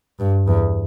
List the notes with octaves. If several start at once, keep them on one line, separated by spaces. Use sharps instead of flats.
G2
E2